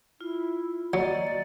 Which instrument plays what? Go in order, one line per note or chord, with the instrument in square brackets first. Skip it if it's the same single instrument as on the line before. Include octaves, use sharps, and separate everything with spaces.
[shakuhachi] E4 [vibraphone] F4
[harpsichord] F#3 [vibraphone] A#3 D#5 [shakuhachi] D5